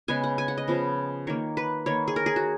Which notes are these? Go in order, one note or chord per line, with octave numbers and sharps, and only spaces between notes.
C#3 G#3 B3 G#5
F#5
G#5
F#5
D#5
C#3 F3 B3
D#3 A#3 C#5
B4
D#3 A#3 C#5
G#4
A#4
G#4
F#4